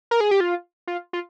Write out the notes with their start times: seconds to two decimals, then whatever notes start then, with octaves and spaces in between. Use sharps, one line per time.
0.11 A#4
0.21 G#4
0.31 G4
0.40 F4
0.88 F4
1.13 F4